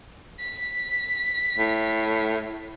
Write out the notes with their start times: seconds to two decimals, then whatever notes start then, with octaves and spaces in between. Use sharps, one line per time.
0.40 B6
1.58 A2